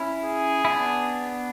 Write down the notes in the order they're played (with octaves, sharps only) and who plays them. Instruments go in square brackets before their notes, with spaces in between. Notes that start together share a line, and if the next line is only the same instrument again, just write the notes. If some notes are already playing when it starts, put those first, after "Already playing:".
Already playing: [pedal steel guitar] C#4 E4
[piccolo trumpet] G#4
[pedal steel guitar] E4
B3 D4